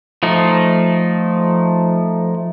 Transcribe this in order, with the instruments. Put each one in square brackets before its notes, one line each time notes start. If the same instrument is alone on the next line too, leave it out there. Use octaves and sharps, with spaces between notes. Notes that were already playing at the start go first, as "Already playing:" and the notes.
[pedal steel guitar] F3 A3 D#4